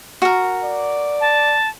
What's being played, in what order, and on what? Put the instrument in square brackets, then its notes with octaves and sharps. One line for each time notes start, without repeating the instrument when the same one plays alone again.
[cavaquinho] F#4 A#4
[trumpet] D5
[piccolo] A5